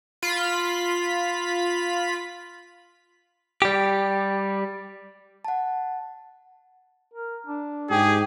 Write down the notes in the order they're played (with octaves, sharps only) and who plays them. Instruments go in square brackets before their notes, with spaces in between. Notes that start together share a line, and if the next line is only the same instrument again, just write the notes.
[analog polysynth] F4 B5 B6
[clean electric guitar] G3 G4
[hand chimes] F#5 A5
[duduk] A#4
D4
[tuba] G#2 [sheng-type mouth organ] G4 [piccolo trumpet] G#4